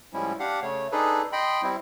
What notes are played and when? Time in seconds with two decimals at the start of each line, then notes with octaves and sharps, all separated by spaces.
0.13 A2 F3 G3 G#3 C#4 E4
0.40 D4 G4 F5 F#5
0.62 C#3 A3 C#5
0.92 D4 D#4 G#4 A4 B4
1.32 D#5 G5 B5 C6
1.63 G3 C4 E4